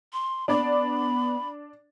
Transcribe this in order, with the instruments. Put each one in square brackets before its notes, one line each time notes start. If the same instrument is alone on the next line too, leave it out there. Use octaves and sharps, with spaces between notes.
[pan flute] C6
[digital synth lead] B3 [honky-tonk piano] D4 D5 [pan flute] B5